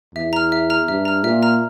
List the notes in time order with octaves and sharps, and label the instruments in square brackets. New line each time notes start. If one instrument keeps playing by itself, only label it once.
[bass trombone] E2 [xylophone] E5
[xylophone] A#5 F6
E5
A#5 F6
[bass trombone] G2 [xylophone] E5
[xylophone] A#5 F6
[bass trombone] A#2 [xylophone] E5
[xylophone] A#5 F6